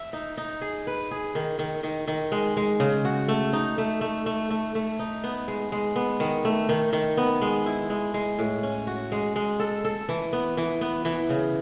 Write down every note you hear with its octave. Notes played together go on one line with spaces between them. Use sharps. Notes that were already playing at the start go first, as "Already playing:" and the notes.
Already playing: E5
D#4
D#4
G#4
B4
G#4
D#3
D#3
D#3
D#3
G#3
G#3
C#3
F#4
A3
D#4
A3
A3
A3
A3
A3
D#4
B3
G#3
G#3
B3
D#3
A3
D#3
D#3
B3
G#3
E4
G#3
G#3
A2
C#4
F#4
G#3
G#3
A4
A4
E3
B3
E3
B3
E3
C#3